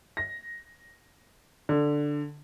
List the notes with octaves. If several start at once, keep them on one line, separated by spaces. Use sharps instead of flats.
A#6
D3